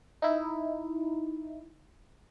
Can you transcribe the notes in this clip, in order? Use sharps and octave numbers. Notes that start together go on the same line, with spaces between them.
D#4 E4